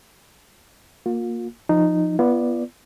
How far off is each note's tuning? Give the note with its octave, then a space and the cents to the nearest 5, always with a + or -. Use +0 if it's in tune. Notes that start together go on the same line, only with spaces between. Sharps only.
A#3 +0 F4 +35
F3 +0 D#4 -10
B3 -10 F4 -40 D5 +0